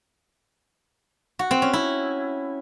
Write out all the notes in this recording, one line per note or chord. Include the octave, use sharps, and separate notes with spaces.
F#4
C4
C#4
E4